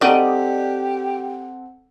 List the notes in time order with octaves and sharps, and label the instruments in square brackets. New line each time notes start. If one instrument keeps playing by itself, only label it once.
[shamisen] G3 D#4 [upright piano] C4 A4 F#5 [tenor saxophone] G4 [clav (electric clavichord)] D5 D#5